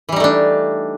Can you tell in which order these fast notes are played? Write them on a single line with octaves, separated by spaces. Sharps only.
E3 G3 D#4 A3 D4